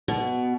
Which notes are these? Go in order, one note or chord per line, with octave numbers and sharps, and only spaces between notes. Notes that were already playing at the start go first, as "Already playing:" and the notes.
B2